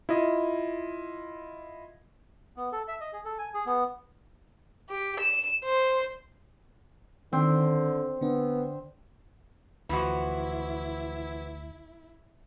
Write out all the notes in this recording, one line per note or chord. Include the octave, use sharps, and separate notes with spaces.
E4 F4 D#5
B3
A4
E5
D#5
G#4
A4
G#5
G#4
B3
G4
E7
C5
D3 D#3 C4
D3 B3 D4
D2 E3 F3 E4 F#4